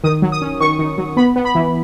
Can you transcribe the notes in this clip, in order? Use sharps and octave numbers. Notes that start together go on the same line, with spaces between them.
D#3 D#6
F#3
D#6
C#4
D#3 C#6
D#3
F#3
B3 B5
B3
B5
E3